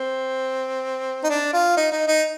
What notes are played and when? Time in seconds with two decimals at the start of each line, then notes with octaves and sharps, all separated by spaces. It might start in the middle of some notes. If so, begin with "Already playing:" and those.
Already playing: C4
1.24 D#4
1.30 D4
1.53 F4
1.77 D#4
1.92 D#4
2.08 D#4